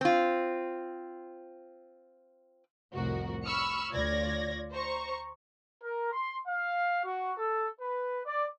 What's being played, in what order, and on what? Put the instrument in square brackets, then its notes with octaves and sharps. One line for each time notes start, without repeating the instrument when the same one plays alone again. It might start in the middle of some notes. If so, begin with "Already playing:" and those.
[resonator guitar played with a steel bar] C4 F4
[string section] C2 F2 A2 F#4 A#4
B5 C#6 E6 F6 C#7
D2 F4 C#5 D5 G#6 A#6
C5 A#5 C#6
[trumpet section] A#4
C6
F5
F#4
A4
B4
D5